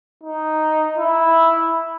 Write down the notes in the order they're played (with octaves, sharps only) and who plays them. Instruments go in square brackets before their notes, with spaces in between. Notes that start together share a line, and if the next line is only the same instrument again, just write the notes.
[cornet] D#4
E4